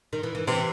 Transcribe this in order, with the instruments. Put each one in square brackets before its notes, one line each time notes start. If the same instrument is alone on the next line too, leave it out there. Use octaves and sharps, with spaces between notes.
[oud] D#3
E3
E3
[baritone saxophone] C3 [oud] E3